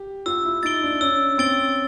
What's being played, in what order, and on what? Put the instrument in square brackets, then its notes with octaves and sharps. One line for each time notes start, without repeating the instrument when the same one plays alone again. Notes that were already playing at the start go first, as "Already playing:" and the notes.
Already playing: [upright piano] G4
[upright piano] F4 [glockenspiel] E6
[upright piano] E4
[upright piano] D#4 [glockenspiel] A6
[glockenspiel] D7 G7
[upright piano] D4
[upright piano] C#4 [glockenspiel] E6
[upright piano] C4 [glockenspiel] A6 D7 G7